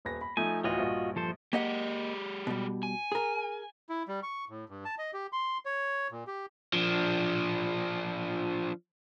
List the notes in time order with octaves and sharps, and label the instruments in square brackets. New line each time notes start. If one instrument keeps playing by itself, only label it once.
[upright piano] D#1 B4 A#6
B5
[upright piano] F3 A3 D#4 [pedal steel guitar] G#5
[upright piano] D2 A2 E3 [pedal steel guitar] F4 F#4 D#5
[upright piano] A#1 G2
[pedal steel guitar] F3 A4 C5
[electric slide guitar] G#3 G4 [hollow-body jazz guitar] A#3 D#5 F#5
[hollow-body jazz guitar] B2 G3
[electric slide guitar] G#5
[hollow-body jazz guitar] G#4 A#4
[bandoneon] E4
G3
C#6
A2
G2
A5
D#5
G4
C6
C#5
A#2
G4
[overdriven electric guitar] F3 D4